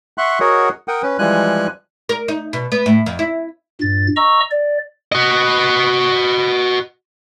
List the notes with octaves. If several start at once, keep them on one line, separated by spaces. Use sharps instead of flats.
E5 F#5 C6 C#6 F#6
F#4 G#4 A#4 C#5 D#5 F#5
A#4 F#5 G5 D#6
C#4 B4
E3 F3 G3 G#3 G#5 F#6
A#4
D#4
B2
B3
A2
F2
E4
G2 A#2 A6
D#5 A#5 C#6 E6
D5
F#4 D#5